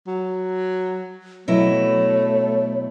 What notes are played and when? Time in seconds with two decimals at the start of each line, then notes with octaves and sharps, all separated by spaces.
0.07 F#3
1.48 B2 F#3 A3 E4 C#5